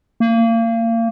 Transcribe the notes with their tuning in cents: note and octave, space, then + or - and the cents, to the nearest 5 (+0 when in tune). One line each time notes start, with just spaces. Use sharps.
A#3 -30